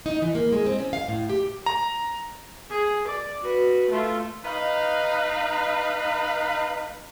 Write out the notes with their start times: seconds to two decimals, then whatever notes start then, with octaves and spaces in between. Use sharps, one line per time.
0.06 D#4
0.22 E3
0.35 A#3
0.52 G#3
0.66 C4
0.79 C#4
0.93 F5
1.08 A2
1.30 G4
1.66 A#5
2.71 G#4
3.08 D5
3.42 F#4 B4
3.90 A3 F4
4.45 D#4 B4 F5